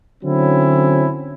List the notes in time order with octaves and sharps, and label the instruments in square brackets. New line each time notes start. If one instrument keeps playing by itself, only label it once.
[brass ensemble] D3 F#3 C4 C#4 E4